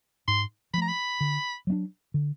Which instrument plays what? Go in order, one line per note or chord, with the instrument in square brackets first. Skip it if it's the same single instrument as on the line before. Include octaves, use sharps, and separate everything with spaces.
[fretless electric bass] G#2 [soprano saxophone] C6
[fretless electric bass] F3 [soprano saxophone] B5
[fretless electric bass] A3 [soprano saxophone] A#5
[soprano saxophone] B5
[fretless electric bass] D3
F#3 A3 D4
D3